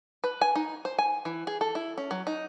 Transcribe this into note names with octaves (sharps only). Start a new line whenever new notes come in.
B4
G#5
D#4
C5
G#5
E3
G#4
A4
E4
C#4
F#3
D#4